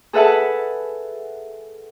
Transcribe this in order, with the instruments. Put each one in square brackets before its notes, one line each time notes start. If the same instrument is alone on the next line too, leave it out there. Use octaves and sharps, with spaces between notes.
[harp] G#4 A4 B4 E5 F#5 A5